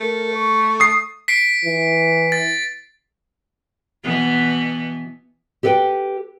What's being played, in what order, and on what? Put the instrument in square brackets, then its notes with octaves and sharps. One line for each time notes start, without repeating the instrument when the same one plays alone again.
[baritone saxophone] A3 [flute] A#4
[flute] C#6
[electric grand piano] D#6 C7
[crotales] B6 C7 D7
[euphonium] E3
[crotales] A6
[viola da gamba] B2 E3 B3
[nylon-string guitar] G4 A4 B4 E5 G5